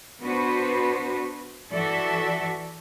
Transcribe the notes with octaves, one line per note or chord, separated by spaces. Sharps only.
B3 D4 F#4 B4 C5
E3 F#4 A4 D5 E5